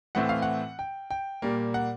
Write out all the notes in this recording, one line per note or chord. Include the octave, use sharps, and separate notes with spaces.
A2 E3 A3 C4 F#5
F5
F#5
G5
G5
A#2 G3 A#3
F#5